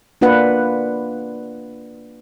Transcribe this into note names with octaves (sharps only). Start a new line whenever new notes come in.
A#3 D4 F4 B4 F#5